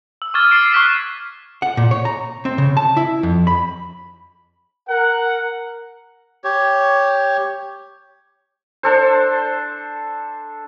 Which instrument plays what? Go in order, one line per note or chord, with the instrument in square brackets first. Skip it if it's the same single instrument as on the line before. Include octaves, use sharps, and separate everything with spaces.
[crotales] E6
C#6 D6 E6 F6 G#6 A6
D6 A6 C7 D7
C#6 F6 F#6 B6 C7 E7
[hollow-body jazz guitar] F#5
A#2
C#5
A#5
C4
C#3
A5
E4
F2
B5
[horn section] A#4 F#5
[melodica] G4 C#5
[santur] D4 A4 C5